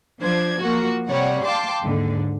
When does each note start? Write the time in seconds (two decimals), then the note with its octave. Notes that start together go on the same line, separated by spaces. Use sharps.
0.20 F3 D4 C5 G#6
0.60 F3 A#3 F#4
1.06 C3 G3 C#5 F#5
1.43 F5 G5 A5 C6 D6
1.82 D#2 G#2 D3